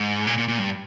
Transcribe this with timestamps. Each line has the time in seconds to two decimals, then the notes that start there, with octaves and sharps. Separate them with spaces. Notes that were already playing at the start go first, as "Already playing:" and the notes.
Already playing: G#2
0.27 A#2
0.38 A#2
0.48 A#2
0.59 G2